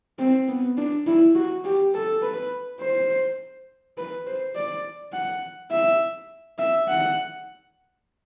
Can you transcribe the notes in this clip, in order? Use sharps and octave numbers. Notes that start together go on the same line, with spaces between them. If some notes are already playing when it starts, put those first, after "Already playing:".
C4
B3
D4
E4
F#4
G4
A4
B4
C5
B4
C5
D5
F#5
E5
E5
F#5